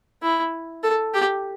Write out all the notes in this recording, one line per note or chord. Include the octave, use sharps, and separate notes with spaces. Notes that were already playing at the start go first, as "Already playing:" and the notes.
E4
A4
G4